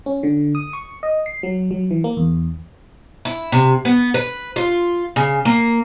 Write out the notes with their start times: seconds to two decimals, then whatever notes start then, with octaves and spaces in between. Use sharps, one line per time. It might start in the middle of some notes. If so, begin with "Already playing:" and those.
0.06 C#4
0.23 D3
0.55 D#6
0.73 C#6
1.03 D#5
1.26 C7
1.43 F#3
1.71 F#3
1.91 E3
2.04 A#3
2.17 E2
3.25 E4
3.52 C3
3.85 B3
4.14 B4
4.56 F4
5.16 C#3
5.45 A#3